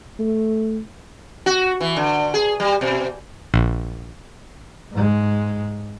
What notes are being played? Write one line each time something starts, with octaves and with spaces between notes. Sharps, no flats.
A3
F#4
E3
D3
G#4
G3
B2
A#1
G#2 G#3